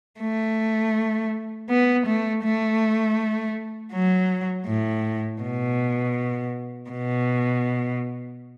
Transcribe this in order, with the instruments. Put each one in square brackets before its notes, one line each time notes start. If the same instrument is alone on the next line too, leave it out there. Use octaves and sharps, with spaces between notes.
[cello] A3
B3
A3
A3
F#3
A2
B2
B2